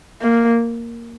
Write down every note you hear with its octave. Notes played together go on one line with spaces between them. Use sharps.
A#3